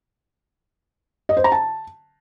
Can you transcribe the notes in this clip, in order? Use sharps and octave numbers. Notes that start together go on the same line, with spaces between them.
D#5
C5
A#5
A5